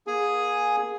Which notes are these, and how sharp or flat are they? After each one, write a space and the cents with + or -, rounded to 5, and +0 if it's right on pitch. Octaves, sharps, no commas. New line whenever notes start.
A#3 +35 G#4 +0 G#5 +0